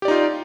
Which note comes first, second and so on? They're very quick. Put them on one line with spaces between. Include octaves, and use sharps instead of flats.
G4 D5 D#4 F4